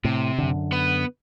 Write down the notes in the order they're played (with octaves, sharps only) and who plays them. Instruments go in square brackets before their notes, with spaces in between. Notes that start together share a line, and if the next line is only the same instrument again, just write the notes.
[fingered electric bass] A2 [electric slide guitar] C3
[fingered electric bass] F#2 D3
[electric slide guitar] B3 B4